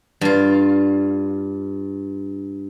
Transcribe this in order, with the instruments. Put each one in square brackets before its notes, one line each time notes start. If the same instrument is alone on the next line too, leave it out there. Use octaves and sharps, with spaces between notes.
[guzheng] G2 F4